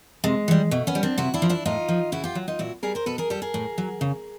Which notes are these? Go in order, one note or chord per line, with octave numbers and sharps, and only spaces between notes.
C3 G#3
E3 G3
B2 A3
B3 C#4
G3
C4 D4
C3 E4 F#4
D4 E4
F3
D4 E4
A2 D#4 F4
F3
C#3 E4 F#4
F4 G4
F#3
D#4 F4
A#2 E4 F#4
G3 G#4 A#4
A#4 C5
B2 A4 B4
G#4 A#4
G3 G4 A4
G#4 A#4
A2
F#3
C#3